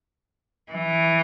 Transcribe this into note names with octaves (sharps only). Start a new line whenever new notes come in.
E3